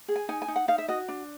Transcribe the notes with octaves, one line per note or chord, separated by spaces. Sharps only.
G#4
G#5
D#4 G#5
G#5
D#4
F#5
D#4 F5
E5
F#4 D#5
D4